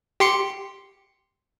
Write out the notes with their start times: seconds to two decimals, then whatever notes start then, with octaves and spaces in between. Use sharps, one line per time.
0.20 G4 C6 C#7